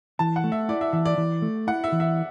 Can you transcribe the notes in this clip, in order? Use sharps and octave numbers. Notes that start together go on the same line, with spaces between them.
E3 A5
F#5
A3
E5
E4 D5
E5
E3 E5
D5
E3
A3
E4 F#5
E5
E3
E5